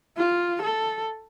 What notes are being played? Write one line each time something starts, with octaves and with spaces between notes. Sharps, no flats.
F4
A4